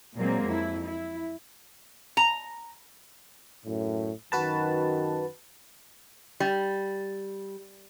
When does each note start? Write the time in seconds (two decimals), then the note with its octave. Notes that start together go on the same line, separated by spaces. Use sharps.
0.16 A#2 F#3 G#3 A#3 C4
0.45 F2 E4
0.84 E4
2.17 A#5
3.64 F#2 A2
4.32 F#2 D#3 F#4 B4 A5
6.40 G3